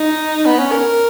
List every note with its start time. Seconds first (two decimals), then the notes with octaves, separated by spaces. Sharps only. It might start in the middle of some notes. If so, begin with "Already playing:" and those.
Already playing: D#4
0.46 B3
0.59 C#4
0.72 A#4